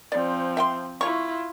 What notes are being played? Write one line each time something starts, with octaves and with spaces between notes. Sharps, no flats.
F3 C4 D5
E5 G5 C6
E4 F4 C#5 C#6